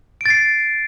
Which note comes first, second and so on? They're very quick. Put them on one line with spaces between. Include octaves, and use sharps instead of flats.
D7 A6 C7